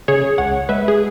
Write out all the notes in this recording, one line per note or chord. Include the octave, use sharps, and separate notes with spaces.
C#3 G#4 C#5
C#2 C#5 F#5
G#3 B4 E5
G#4